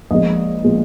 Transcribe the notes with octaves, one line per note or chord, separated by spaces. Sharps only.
A#1 A#2 F3 G#3 D#5
A#2 F3 G#3